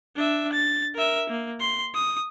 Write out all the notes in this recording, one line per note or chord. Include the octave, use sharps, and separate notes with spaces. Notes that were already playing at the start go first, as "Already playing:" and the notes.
D4 E5
A6
A#4 E5
A#3
C6
D#6